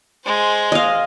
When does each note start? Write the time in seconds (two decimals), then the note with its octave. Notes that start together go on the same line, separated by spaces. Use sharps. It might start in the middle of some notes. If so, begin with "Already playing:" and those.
0.25 G#3 C5
0.72 D#5 F5